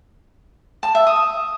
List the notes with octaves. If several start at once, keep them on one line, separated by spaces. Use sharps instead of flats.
A5
E5
D#6